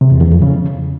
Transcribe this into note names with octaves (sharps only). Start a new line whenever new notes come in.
C3
E2
E2
F2
C#3